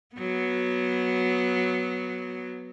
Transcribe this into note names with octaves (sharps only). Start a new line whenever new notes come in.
F#3 B3